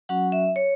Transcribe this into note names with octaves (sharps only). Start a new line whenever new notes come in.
F#3 C#4 F#4 F#5
E5
C#5